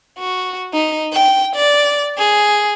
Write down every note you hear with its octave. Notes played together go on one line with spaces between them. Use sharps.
F#4
D#4
G5
D5
G#4